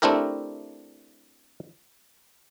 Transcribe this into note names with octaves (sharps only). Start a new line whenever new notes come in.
A3 C4 D4 E4 G4 A#4